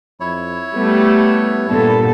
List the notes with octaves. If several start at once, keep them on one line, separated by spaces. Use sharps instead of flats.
F2 E4 C#5
G3 A3 B3
G2 A#2 B3 A4